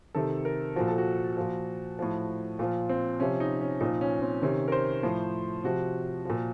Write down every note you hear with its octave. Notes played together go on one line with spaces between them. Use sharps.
C3 D#3 A4
A#4
A#2 F3 F#4
A4
F#4
A#2 F3
A2 F3
A#2 F3 F4
C4
C3 F3 C#4
D#4
C#4
A#2 F3 D#4
C#4
C4
C3 D#3 C#4
A#4
C5
A2 F3
C3 F3 F#4
A#2 F3